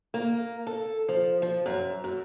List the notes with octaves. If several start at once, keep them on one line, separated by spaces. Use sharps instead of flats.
A#3
A4
F3
F3
F#2
F#2